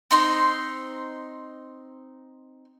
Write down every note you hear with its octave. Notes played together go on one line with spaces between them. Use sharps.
C4 D#4 C6